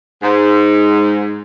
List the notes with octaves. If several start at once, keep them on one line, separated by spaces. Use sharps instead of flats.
G#2